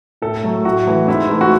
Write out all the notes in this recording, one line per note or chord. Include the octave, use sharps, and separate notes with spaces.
A2 A4
F#3 A3
A2 F#4
E3 A3
G#2 E4
E3 A3
F#4